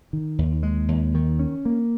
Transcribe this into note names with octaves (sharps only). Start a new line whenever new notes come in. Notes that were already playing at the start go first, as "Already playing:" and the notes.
D#3
D#2
G#3
D#2
D#3
C#4
A#3